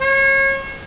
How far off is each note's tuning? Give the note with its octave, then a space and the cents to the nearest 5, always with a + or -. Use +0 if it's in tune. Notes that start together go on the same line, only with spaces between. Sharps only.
C#5 -30